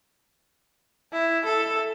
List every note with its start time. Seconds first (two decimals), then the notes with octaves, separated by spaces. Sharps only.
1.13 E4
1.45 A4